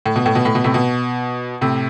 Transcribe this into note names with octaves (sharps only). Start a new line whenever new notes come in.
A2
B2
A2
B2
A2
B2
A2 C3
B2
A2 C3